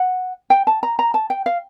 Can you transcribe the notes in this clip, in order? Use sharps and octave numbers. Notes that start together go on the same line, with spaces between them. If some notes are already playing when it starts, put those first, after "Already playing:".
Already playing: F#5
G5
A5
A#5
A#5
A5
G5
F5